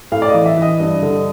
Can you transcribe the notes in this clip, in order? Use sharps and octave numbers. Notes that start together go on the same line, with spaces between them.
A2 F5
D5
D#5
E3
E5
E3
D#5
G2
D3